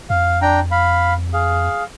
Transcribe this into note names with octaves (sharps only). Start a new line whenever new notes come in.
F2 F5
D4 G5 A#5
F5 B5
G#4 F5